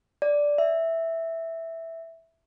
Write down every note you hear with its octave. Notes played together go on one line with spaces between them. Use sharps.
D5
E5